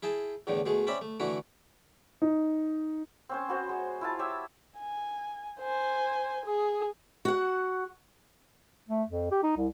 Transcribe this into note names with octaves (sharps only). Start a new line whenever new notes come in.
E4 G#4 G5 A5
E2 A2 D3 A3
B2 G#3 A3 G#4
C4 C#4 D5 E5 B5
A3
D3 E3 A3 E4 F#4
D#4
C4 C#4 C5
B3 F#4 C5
G#3
E4 F4 A5
G4 C#5 E5 E6
G#5
C5 G#5
G#4
F#4 F#5
A3
F2
G4
D#4
C2